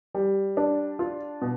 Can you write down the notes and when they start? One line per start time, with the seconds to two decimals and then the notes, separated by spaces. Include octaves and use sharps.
0.15 G3
0.57 D4
0.99 F4
1.42 B2